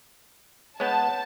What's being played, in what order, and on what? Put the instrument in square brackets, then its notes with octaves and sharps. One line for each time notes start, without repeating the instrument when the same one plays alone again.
[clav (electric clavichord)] G#3 B3 [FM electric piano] C#5 F#5 G6 [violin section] A5